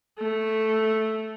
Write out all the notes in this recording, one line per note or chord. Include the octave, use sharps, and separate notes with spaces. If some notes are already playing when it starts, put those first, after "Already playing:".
A3